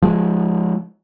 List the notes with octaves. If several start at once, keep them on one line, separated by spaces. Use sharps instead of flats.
F3 G#3